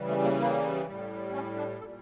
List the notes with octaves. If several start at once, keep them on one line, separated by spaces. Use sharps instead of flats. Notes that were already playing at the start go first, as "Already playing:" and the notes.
Already playing: C#3 E3 G3
A3
A#3
A#3
A2 G3
C#4
D4
A#2 G3 A4